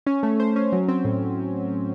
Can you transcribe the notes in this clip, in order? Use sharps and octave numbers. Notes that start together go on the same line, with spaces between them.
C#4
A3
C5
C#4
F#3
C4
A2